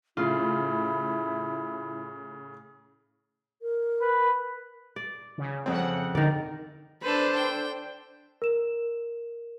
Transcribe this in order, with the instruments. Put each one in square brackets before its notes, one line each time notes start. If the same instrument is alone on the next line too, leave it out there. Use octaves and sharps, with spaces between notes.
[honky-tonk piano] A2 C#3 [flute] E4 [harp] F4
[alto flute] A#4
[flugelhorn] B4
[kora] D5
[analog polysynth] C#3
[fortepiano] F2 C4 [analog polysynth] C#3 F#5
[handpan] D3 [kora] D#3 D5 [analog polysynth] A#4
[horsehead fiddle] D4 C5 [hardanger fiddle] A4 B4
[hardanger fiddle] G5
[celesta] A#4 E7